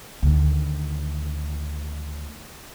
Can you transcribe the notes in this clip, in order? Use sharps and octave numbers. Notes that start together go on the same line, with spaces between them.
D2 D#3